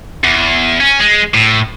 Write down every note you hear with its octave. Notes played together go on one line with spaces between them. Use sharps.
E2
C#4
G#3
A2